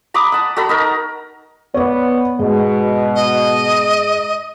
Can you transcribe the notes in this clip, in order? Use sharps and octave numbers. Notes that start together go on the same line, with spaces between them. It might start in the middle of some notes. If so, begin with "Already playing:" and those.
A#5 B5 D6 D#6
F#5 A5
F#4 A4 A#5 B5
D#4 A#4 A#5
B3 C#5 D5
G#2 B2
D#5